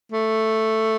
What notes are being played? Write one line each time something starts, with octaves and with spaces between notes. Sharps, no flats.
A3